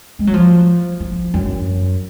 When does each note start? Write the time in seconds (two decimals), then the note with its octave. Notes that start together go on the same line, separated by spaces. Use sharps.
0.19 G#3
0.27 F#3
0.34 F3
1.00 F3
1.34 F#2